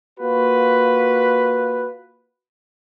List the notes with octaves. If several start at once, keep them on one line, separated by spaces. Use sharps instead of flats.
A#3 F4 F#4 B4